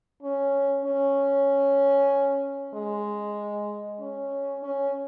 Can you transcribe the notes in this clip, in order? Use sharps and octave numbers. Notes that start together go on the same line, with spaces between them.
C#4
C#4
G#3
C#4
C#4